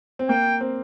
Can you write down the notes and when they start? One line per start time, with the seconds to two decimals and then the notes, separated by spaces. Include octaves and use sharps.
0.19 C4
0.29 A#3 G5
0.61 C4